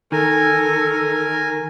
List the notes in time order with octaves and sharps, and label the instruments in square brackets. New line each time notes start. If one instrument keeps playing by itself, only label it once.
[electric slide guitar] D#3 [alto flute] A4 [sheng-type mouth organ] A#4 G#5